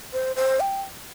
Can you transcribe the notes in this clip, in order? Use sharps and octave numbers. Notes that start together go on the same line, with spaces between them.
C5
C5
G5